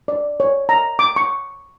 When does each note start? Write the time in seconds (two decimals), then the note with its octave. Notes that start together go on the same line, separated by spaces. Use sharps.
0.08 D5
0.40 C#5
0.69 A#5
0.99 D6
1.16 C#6